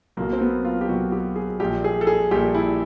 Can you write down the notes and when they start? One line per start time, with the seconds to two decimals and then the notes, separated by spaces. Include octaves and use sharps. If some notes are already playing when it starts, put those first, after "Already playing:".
0.17 B1 B2 F#3 A#3
0.33 C4
0.41 B3
0.65 F4
0.81 G4
0.88 B1 B2 F#3 F#4
1.12 G4
1.36 G#4
1.60 A#1 A#2 G3 G4
1.84 G#4
2.01 A4
2.07 G#4
2.31 A#1 A#2 G3 G4
2.55 E4